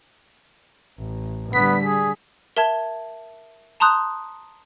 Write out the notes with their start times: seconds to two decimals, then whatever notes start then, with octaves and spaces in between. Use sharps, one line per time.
0.98 A1
1.53 D3 G3 B3 B6
1.84 G#4
2.57 A#4 E5 A5 G#6 G7
3.80 A5 A#5 C6 D#6 F#6 G6